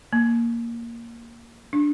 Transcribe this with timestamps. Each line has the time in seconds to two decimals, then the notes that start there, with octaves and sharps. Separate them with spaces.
0.13 A#3
1.73 D4